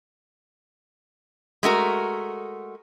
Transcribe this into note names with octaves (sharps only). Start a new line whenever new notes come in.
G#3 A3 F#4 A#4